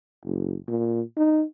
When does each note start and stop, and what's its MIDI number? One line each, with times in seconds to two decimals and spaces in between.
0.25 0.56 30
0.68 1.01 46
1.17 1.44 63